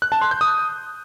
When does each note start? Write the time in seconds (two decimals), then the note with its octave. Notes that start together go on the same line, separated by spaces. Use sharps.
0.02 F#6
0.12 A5
0.21 C6
0.31 G6
0.41 D#6